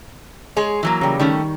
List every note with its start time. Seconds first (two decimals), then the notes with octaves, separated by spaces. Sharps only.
0.56 G#3 G#4 C#5
0.83 E3 F#3 A#3
1.01 C#3 G3
1.20 D#3 G3 A3 C#4 C#6